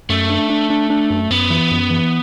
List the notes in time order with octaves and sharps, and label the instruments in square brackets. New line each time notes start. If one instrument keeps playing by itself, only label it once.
[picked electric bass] F#2 [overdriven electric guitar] A3
[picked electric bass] D4
D4
D4
D4
F#2
[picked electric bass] F#2 [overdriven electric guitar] B3
[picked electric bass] E3
F#2
E3